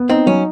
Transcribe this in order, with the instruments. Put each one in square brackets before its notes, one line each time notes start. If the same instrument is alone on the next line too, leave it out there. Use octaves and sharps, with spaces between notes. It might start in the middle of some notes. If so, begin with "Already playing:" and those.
Already playing: [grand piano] B3
[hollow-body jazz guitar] C4 [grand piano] D#4
[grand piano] F#3 [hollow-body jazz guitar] C#4